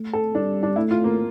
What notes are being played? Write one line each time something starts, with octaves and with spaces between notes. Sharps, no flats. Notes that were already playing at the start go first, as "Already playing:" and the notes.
Already playing: A3
A4
G3 D4
D4
A3 E4
F4
A#3